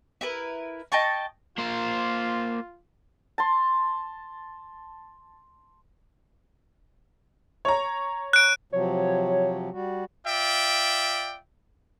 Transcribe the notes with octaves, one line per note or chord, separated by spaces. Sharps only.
E4 A#4 B4
D#5 G5 A5 C#6
A#3 F4 C5
A5 C6
C#5 A#5
F#6 D7
C3 F3 F#3 C#5
G3 F#4
F4 D5 E5 G5